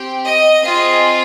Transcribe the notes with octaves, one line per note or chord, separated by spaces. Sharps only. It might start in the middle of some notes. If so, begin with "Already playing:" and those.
Already playing: C4 G4
D#5
C4 F4 G#4